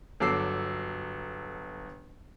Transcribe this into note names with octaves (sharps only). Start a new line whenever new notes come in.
G1 F#3 A4 D6 E6 C7